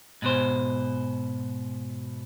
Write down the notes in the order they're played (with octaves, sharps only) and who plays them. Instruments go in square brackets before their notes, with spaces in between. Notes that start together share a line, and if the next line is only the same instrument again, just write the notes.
[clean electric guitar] G#2 B2 C5